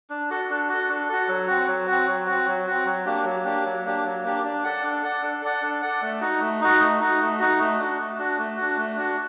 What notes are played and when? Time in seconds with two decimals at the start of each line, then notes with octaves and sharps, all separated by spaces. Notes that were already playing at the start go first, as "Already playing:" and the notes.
0.10 D4
0.30 F#4 A4
0.49 D4
0.69 F#4 A4
0.88 D4
1.09 F#4 A4
1.28 F#3
1.47 C4 F#4
1.67 F#3
1.87 C4 F#4
2.08 F#3
2.26 C4 F#4
2.46 F#3
2.67 C4 F#4
2.85 F#3
3.05 A#3 D4 G4
3.25 F#3
3.44 A#3 D4 G4
3.64 F#3
3.85 A#3 D4 G4
4.05 F#3
4.23 A#3 D4 G4
4.44 D4
4.64 A4 D5 F#5
4.83 D4
5.03 A4 D5 F#5
5.22 D4
5.42 A4 D5 F#5
5.62 D4
5.82 A4 D5 F#5
6.02 A3
6.21 D#4 F#4
6.41 A3
6.61 D#4 F#4
6.80 A3
7.00 D#4 F#4
7.20 A3
7.39 D#4 F#4
7.60 A3
7.78 D4 F#4
7.98 A3
8.18 D4 F#4
8.38 A3
8.58 D4 F#4
8.77 A3
8.97 D4 F#4